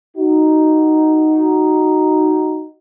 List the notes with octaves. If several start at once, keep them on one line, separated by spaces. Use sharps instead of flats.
D#4 F#4